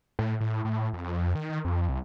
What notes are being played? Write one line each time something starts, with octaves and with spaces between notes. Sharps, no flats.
A2
A2
A2
F2
D#3
D#3
F2
C2